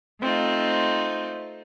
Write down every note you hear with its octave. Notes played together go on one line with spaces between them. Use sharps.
A3 C4 D#4 F4